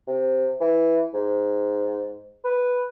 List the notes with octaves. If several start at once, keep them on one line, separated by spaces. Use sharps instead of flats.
C3
E3
G#2
B4